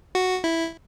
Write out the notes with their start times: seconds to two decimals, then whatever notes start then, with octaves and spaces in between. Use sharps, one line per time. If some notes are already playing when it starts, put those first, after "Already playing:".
0.15 F#4
0.44 E4